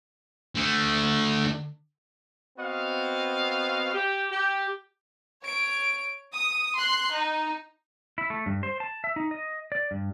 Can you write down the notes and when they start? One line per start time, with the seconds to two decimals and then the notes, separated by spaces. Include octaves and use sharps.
0.55 D3 A3
2.58 B3 C4 F#4 D#5 F5
3.93 G4
4.32 G4
5.43 C#5 D7
6.34 D#6
6.75 C6 F#6
7.11 D#4
8.18 E4
8.30 A3
8.46 G2
8.63 C5
8.80 A5
9.04 E5
9.16 D#4
9.31 D#5
9.72 D5
9.91 G2